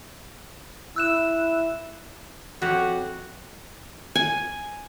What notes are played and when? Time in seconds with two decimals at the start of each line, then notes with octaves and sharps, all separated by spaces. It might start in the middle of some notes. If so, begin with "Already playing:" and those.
0.96 E4 E6 F#6 E7
2.62 F2 F#4 G4 C#5
4.15 G#5